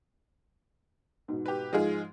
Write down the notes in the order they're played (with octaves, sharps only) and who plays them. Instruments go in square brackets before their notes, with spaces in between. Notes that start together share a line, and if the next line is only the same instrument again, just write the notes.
[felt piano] G#2 B2
[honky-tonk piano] G4 B4
[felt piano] G#2 F3 [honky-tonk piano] G#3 F4 G#4